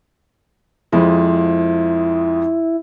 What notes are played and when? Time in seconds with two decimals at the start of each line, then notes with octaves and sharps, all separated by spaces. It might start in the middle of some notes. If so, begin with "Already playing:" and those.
0.92 F2 F3 G#3 E4